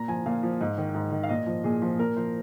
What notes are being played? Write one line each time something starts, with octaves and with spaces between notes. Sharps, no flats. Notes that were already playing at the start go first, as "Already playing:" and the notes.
Already playing: A#2 A#5
F3 G#5
A#2 F5
F3
G#2
D#3
G#2
D#3
F5
A#2 D#5
F3
A#2 G#4
F3
A#2 A#4
F3 C5